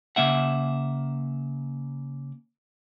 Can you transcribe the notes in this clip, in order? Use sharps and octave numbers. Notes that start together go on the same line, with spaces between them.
C#3 A#3 E5 F#5